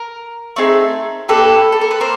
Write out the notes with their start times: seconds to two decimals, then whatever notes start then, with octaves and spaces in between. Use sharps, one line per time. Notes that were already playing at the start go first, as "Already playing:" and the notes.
Already playing: A#4
0.56 A3 C4 D#4 G#4
1.29 A#3 D4 G4 A4 B4
1.72 A4
1.81 A#4
1.91 B4
2.00 A#3 A#4 C5